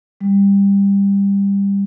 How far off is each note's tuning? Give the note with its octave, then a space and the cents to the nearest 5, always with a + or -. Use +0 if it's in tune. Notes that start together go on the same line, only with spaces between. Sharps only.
G3 +20